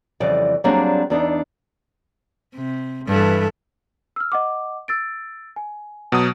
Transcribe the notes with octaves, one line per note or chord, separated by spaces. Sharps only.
F2 C#3 E3 G3 D5
F#3 G3 A#3 C4 D4 G#4
E2 D4 D#4
C3
G2 E3 A4
E6 F6
D#5 F#5 D6
E6 A6 D7
G#5
B2 F#3 D#6